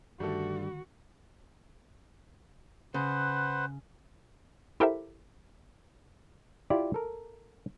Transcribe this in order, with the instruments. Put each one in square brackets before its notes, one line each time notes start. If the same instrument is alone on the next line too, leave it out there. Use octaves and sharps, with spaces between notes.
[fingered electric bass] G2 [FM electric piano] D3 D#3 [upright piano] G3 A3 A4 [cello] F#4
[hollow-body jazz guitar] C#3 [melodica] B4 C5 F#5
[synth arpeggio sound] E4 G4 A4 A#4 C5 E5
[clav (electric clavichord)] E4 F4 G4 D5
A4 A#4